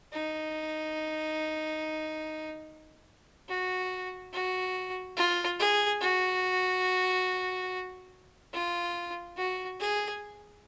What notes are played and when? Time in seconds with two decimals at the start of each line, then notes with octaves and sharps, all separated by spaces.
0.12 D#4
3.49 F#4
4.33 F#4
5.17 F4
5.59 G#4
6.01 F#4
8.53 F4
9.37 F#4
9.80 G#4